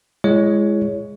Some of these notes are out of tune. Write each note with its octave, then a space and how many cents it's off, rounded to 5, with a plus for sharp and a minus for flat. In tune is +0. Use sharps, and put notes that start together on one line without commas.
G#3 +0 E4 +35 C#5 +10